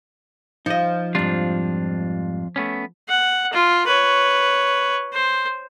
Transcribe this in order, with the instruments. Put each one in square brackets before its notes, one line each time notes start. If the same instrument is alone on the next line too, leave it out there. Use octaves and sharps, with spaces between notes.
[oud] F3 [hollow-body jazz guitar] D#4 D#5
[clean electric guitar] F2 D4 F4 [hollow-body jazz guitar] G#2 G3
[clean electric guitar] A3 B3 C#4
[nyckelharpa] F#5
F4
B4 C#5
C5